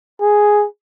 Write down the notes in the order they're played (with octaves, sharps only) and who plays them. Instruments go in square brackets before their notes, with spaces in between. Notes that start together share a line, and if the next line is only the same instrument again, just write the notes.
[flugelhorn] G#4